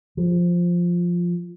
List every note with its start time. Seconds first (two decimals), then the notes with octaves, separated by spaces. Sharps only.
0.17 F3